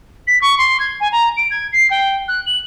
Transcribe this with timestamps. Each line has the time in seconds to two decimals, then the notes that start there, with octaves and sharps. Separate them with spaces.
0.27 B6
0.41 C#6
0.57 C6
0.79 G#6
1.00 G#5
1.12 A#5
1.36 D7
1.50 G#6
1.72 C7
1.90 G5
2.28 F#6
2.46 F#7